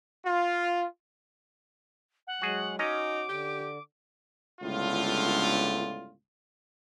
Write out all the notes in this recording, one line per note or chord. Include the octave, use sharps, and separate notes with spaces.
F4
F#5
F#3 G#3 F#4 G#4
C#4 D#4 F#4 D#5 A#5 D6
D3 G4
G1 C#2 A2 D3 F4